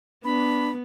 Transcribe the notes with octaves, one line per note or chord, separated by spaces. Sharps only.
B3 D4 B5